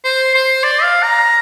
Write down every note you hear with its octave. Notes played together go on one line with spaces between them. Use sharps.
C5
C5
D5
F5
A#5